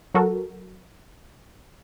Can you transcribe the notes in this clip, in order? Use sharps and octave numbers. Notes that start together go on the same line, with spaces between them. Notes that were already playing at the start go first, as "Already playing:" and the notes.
F#3 F#4 A4 A#4